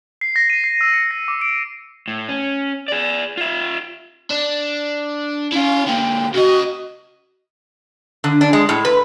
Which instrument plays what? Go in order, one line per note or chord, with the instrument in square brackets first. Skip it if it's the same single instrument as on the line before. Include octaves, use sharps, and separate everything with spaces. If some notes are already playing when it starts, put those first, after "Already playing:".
[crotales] C7
A#6
D#7
C7
E6
C#7
A#6
D6
D7
[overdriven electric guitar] A2
C#4
G#4 D5
F4 E5
D4
[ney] C#4 [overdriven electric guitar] E4 F5
[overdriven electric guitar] D3 A#3 [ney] G5
[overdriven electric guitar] C#3 D#5 [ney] F#4
[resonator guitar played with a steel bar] D3
D4
G#3
A2
B4